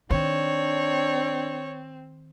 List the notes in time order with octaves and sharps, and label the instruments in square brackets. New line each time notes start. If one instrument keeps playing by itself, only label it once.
[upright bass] D#3 [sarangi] C4 [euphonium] D4 [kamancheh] C#5